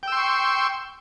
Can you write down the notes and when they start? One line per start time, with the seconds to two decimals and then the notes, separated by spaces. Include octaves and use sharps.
0.03 G5
0.08 E6
0.12 C6
0.17 C#6